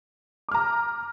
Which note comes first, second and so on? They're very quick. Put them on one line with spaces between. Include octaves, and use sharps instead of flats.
D6 F6 A#5